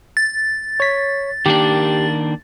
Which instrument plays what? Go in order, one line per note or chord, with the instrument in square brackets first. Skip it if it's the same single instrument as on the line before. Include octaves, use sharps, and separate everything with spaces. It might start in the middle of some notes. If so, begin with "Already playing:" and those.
[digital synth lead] A6
[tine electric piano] C#5 B6
[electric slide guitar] D#3 A#3 D4 [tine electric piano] G4